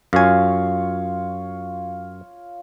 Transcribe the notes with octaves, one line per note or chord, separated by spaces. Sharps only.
F#2 F4 C#5 F5 G#5